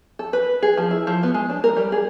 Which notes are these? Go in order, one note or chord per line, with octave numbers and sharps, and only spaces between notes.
A4
B4
G#4
F3
E4
F3
B3
G#3
D4
A#4
G3
G#4